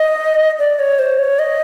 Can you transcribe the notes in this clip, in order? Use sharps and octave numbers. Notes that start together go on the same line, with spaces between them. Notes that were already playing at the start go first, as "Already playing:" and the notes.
Already playing: D#5
D5
C#5
C5
C#5
D#5